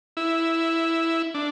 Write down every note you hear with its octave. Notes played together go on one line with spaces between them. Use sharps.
E4
D4